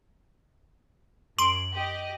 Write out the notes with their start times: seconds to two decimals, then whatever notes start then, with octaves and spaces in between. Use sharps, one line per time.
1.38 F#2 C6 D7 F#7
1.73 G4 D#5